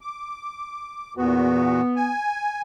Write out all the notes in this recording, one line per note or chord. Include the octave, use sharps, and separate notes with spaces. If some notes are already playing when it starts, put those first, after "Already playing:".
D6
E2 A#2 B3 F#4
G#5